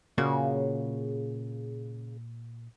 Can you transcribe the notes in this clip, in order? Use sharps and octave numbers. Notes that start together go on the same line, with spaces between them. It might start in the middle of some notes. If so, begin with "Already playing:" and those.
A#2 C#3 A#3 F#4